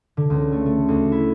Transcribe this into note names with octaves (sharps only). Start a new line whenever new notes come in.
D3
C#2
A3
A3
D2
E4